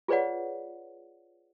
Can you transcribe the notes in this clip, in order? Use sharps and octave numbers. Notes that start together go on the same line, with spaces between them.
F4 G#4 B4 C#5 D5 F#5